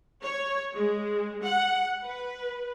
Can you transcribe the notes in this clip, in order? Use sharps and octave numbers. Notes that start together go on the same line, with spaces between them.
C#5
G#3
F#5
B4